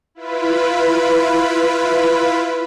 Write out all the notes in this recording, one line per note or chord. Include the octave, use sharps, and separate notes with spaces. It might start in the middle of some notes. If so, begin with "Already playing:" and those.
E4 F4 B4 B5